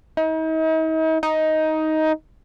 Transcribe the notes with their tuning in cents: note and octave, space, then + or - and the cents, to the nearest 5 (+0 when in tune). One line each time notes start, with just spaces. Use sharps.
D#4 +40
D#4 +10